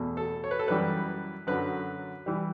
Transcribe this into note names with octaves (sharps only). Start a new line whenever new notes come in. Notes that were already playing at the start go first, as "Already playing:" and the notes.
Already playing: E2 B2 A3
A4
C#5
B4
A4
F#2 E3 G3 B4
F#2 D3 F#3 B4
E3 G3